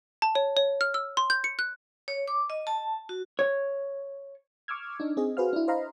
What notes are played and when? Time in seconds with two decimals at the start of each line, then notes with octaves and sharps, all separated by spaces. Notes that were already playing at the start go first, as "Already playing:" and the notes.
0.22 A5
0.35 C#5
0.57 C#5
0.81 F6
0.94 E6
1.17 C6
1.30 G6
1.44 C#7
1.59 F#6
2.08 C#5
2.28 D6
2.50 D#5
2.67 A5
3.09 F#4
3.39 C#5
4.68 C#6 D6 E6 F6 G#6
5.00 D4 D#4
5.17 C4 G#4 D#5
5.37 F#4 G#4 B4 C5 F5 F6
5.53 D4 E4
5.68 C5 D#5 F5 A#5 B5